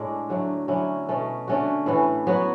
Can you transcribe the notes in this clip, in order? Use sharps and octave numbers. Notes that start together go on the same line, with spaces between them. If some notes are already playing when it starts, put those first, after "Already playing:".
Already playing: A2 G#3 D4
D3 F#3 A3
D3 F#3 C#4 E4
B2 A3 C#4
D3 A3 C#4 F#4
A2 E3 B3
F#3 B3 F#4